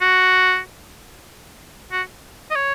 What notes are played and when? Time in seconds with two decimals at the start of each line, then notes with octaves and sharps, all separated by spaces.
0.01 F#4
1.92 F#4
2.51 D#5
2.56 C#5